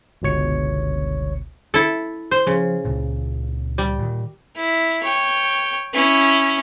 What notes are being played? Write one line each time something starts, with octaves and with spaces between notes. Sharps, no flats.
G1 C#2 B2 C#5 C#7
E4 A4
C5
C#3 F3
C#2 A#2
G3
A#2 D#3
E4
C#5 G5
C#4 E4